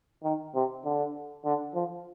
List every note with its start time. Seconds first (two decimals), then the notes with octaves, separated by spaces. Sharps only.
0.23 D#3
0.54 C3
0.85 D3
1.45 D3
1.74 F3